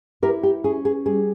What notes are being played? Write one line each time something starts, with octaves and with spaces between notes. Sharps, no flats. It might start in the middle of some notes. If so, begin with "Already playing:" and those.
E4 G4 A#4
G4
C#4 G#4
G#4
G3 G#4